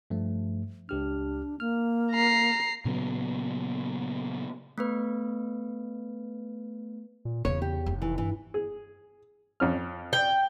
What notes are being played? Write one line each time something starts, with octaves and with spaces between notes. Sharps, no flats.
G2 F3 A3
C#2 D4 G4 F6
A#3 F6
A#5 C7
A#2 C#3 F#3 B3
A3 B3 B4
A#2
E2 C#3 E3 C#5
G4
F1
E3
G2 E3
G#4
F2 C#4 F6
G5